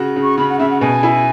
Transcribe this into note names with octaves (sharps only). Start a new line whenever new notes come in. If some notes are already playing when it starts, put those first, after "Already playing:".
Already playing: C#3 F#4
C#3
C#6
C#3 B5
F#5
C#3 E5
F#5
B2 G#5
E4